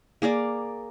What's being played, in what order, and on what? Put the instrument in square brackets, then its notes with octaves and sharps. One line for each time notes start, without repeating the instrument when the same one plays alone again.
[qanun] A#3 G#4 A#4 D5